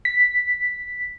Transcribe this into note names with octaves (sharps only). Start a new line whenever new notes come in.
B6